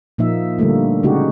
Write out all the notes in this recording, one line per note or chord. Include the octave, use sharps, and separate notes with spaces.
A#2 F3 A#3 D#4 E5
D3 G3 A3 A#3
C#3 G#3 D#4 F#4 G4